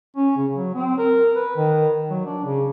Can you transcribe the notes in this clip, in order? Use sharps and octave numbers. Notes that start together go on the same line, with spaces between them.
C#4
C#3
F#3
C4
A#4
B4
D#3
F#3
D4
C#3